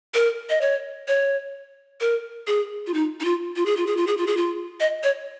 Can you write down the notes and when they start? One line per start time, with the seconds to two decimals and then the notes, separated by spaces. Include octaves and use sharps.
0.14 A#4
0.49 D#5
0.61 C#5
1.08 C#5
2.00 A#4
2.47 G#4
2.87 F4
2.94 D#4
3.20 D#4
3.25 F4
3.56 F4
3.66 G#4
3.77 F4
3.87 G#4
3.97 F4
4.07 G#4
4.17 F4
4.27 G#4
4.37 F4
4.80 D#5
5.03 C#5